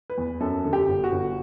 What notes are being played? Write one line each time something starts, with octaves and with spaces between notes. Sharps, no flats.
B4
E2
F#2 A4
D3
G4
G1
F#4
G1